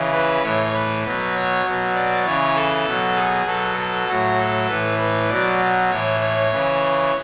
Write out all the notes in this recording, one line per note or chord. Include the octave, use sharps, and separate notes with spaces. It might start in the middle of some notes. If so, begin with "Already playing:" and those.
Already playing: C#3 E3
B4
A2 E3 C#5
B4
B2 F#3 B4
C#5
B2 F#3
D5
C#3 E3 C#5
A4
B2 F#3
G#4
B2 F#3 A4
A4
A2 F#3 F#4
A4
A2 E3 B4
B4
B2 F#3 D5
A2 E3 C#5
C#5
C#3 E3